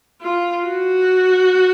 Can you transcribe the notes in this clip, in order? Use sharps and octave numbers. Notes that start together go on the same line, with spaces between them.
F4
F#4